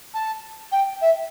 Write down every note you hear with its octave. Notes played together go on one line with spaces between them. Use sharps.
A5
G5
E5